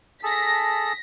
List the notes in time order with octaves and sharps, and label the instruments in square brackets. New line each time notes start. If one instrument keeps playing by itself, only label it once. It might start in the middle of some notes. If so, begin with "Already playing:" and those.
[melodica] G#4 A4 A5 [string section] A#6 B6